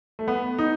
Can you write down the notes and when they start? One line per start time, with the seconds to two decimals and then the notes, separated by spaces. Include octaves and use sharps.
0.19 A3
0.28 B3
0.58 D#4